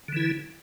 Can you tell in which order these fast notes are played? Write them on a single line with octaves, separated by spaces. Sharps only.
D3 E3 E4